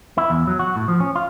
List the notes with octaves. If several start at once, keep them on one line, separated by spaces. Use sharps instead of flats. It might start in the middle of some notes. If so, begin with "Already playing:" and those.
E4
E2
F#3
F#4
A2
F3
C#4
F4